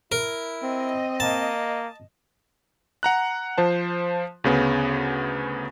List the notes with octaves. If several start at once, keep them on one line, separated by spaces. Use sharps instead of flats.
E4 A#4
C4 D#5
A#3 A5
F#5 A#5 F#6
F3 C5 A5
D2 C#3 B3